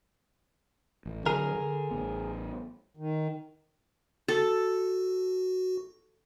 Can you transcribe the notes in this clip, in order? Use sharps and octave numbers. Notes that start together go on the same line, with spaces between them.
A1
D3 F#3 D4 G#4 A#4
D3
A1 B3
D#3
F#4 A4